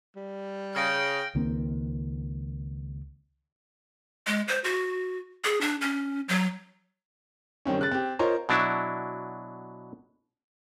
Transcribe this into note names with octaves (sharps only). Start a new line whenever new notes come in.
G3
C#3 G5 F6 A#6 D7
C#2 D#3 A#3 C4
G#3
C5
F#4
G#4
D4
C#4
F#3
G2 D#3 C4 C#4
C#3 F#6 A6
C4 G4
F4 A#4 C5 C#5 D#5
B2 F#3 D4 E4